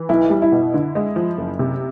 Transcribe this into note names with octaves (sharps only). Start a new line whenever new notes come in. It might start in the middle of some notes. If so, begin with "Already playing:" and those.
Already playing: E3
B1 E4
G3
E4
B2
D3
G#3
F3
F#1
C3